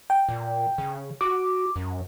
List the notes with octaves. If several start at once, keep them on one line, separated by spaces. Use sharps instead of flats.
G5
A#2
C#3
F#4 D6
F#2